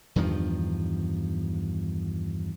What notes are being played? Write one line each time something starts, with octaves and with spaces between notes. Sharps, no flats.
E2 G2 D#3 F3